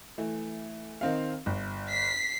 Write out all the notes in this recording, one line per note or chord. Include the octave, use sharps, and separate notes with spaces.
E3 A3
D#3 C4 F5
G1
B6 C7